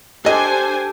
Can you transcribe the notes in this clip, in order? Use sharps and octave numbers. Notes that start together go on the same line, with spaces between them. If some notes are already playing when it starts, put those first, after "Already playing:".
D4 G4 A4 C5 D5 D#5 G#5